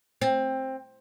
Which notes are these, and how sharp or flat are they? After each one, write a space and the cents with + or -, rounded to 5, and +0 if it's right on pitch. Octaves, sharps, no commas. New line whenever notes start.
C4 +15